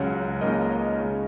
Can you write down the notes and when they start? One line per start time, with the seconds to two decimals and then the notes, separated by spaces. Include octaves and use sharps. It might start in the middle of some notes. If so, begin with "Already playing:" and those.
Already playing: C#2 C#3 F#3 C#4 C#5 F#5
0.41 C#2 C#3 A#3 D#4 A#4 D#5
0.71 C#5
0.99 C#3 G#3 C#4 C#5